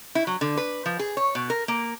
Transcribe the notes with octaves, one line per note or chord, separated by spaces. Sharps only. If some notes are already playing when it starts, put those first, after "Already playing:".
E4
F#3
D3
B4
F3
G#4
C#5
B2
A#4
A#3